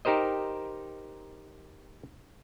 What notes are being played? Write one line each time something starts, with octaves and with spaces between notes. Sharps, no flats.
D#4 G4 A#4 C5 D#5